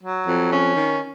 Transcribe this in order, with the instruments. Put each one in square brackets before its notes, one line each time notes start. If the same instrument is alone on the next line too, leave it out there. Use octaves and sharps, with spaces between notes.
[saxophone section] F#3
F2
C#4
D#3